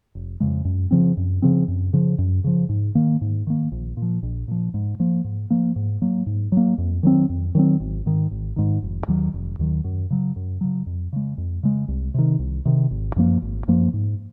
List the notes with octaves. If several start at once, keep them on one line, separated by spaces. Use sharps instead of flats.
F1
F2 C#3 G#3
F#2
C#3 F3 C4
F#2
C#3 F3 C4
F#2
C#3 F3
F#2
C#3 F3
G#2
D#3 A#3
G#2
D#3 A#3
A#1
A#2
F3
A#1
A#2 F3
G#2
F3 A#3
G#2
F3 A#3
G#2
F#3 A#3
G#2
F#3 A#3
F2
D#3 F#3 C4
F2
D#3 F#3 C4
G#1
G#2 D#3
G#1
G#2 D#3
F1
D#2 D#3 F#3
F1
D#2 D#3 F#3
F#2
C#3 F#3
F#2
C#3 F#3
F2
C#3 G#3
F2
C#3 G#3
C2
C3 D#3
C2
C3 D#3
G#1
F#2 F3 A#3
G#1
F#2 F3 A#3
G#2